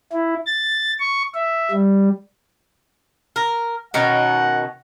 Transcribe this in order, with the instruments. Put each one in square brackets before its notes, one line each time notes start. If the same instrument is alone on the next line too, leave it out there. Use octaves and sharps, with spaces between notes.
[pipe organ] E4
A6
C#6
E5
G3
[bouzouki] A#4
[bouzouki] B2 D#3 C#4 [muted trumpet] F#5